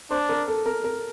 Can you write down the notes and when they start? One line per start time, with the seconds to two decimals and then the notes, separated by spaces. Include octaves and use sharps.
0.11 D4 C5
0.29 A#4
0.48 A4
0.66 A#4
0.84 A#4